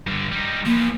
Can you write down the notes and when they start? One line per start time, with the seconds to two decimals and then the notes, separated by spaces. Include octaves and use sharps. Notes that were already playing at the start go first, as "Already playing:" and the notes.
0.07 G2 D3
0.32 G3 D#4
0.66 E3 F3 A#3